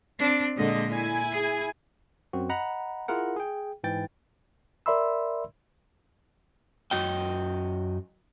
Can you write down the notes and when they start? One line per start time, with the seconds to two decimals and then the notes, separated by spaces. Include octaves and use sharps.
0.19 C4 D4
0.56 A#2 D3 G#3 D#5
0.91 E4 G#5
1.31 G#4
2.33 F#2 C4 F#4
2.49 D#5 F#5 A#5 B5
3.08 E4 F4 G#4 A#4 F#5
3.36 G#4 G5
3.84 G#2 E3 G5 A6
4.86 A#4 D5 E5 B5 C6 E6
6.91 F#2 F#4 D#5 G5